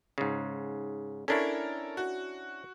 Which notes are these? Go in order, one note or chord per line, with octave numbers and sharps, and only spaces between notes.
G#2 C#3
C#4 D4 E4 A4 A#4 C#5
F#4